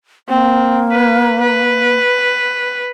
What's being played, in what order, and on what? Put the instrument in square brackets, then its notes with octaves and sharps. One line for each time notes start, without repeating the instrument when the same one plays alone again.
[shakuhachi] A#3 [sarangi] C4
[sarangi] B4
B4